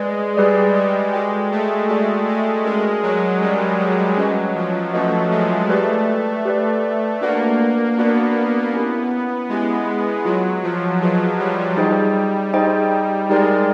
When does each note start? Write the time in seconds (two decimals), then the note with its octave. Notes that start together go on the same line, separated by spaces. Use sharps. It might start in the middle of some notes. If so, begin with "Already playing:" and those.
Already playing: G#3 G#4 B4 D5
0.37 G3 G#4 B4 D5
0.75 G3
1.13 G#3 F#4 A4 D5 G5
1.52 A3
1.89 G#3 F#4 A4 D5 G5
2.28 G#3
2.65 G#3 C#4 F#4 A#4 D5
3.03 F#3
3.41 G3 C#4 F#4 A#4 D5
3.79 G3
4.17 F#3 C#4 F#4 B4 D#5
4.56 F3
4.93 A3 C#4 F#4 B4 D#5
5.31 G#3
5.70 A3 G4 B4 D5
6.45 G4 B4 D5
7.21 A#3 D4 F#4 B4 D5 F#5
7.98 B3 D4 F#4 B4 D5 F#5
8.74 C#4 E4 G4
9.49 G#3 C#4 E4 G4
10.25 F#3 F4 G#4 B4 D#5
10.63 F3
11.02 F#3 F4 G#4 B4 D#5
11.39 G3
11.77 D#4 G#4 C5 D#5 G5
12.53 D#4 G#4 C5 D#5 G5
13.29 G#3 D#4 G4 A#4 D5 G5